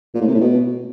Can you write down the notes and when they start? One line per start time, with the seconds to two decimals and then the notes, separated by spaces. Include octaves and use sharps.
0.15 A#2
0.21 A2
0.28 C3
0.34 A2
0.41 B2